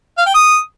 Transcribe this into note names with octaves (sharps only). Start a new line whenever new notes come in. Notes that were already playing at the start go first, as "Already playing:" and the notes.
F5
G5
D#6